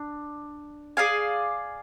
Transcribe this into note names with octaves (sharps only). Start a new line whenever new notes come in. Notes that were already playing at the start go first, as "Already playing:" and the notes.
Already playing: D4
G#4 D5 F5 G#5